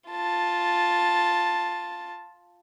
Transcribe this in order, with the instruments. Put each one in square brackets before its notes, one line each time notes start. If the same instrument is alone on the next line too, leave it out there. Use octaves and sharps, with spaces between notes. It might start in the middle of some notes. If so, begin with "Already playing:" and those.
[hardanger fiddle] F4 A5